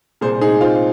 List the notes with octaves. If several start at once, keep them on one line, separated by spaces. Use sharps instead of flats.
C2 A#2 A#3 G#4 C5
D#4 G#4
C4 F4